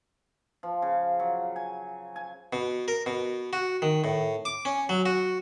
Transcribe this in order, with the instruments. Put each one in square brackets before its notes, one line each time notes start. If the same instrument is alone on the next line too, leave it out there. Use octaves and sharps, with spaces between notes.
[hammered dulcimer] F3
C#3
F#3
G#5
G#5
[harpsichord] B2
A#4
B2
F#4
D#3
A2
D6
C#4
F#3
F#4